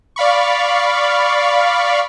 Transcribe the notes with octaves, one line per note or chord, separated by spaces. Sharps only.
D5 F5 B5 C#6